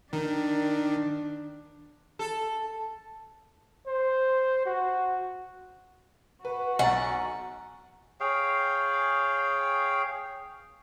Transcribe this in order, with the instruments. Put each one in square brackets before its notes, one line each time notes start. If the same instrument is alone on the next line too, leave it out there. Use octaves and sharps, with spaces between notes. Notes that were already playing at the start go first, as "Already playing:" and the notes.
[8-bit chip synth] D#3 [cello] D4
[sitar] A4
[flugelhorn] C5
F#4
[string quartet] F#4 [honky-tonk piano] B4
[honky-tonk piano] B1 A6 [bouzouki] F#5 [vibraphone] G#5 A#5
[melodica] G#4 C#5 F5 G5